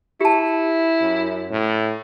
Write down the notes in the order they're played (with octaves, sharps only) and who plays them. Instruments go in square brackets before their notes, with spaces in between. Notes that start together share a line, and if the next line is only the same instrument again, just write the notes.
[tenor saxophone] E4 [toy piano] G4 A5
[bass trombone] F#2
A2